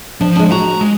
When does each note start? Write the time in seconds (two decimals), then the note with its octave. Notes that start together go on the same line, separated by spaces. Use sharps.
0.21 F3 D4
0.36 G#3 D4
0.52 F#4 A#5
0.81 G#3